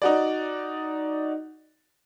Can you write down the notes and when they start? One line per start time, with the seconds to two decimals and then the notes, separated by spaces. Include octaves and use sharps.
0.02 D#4 F#4 D5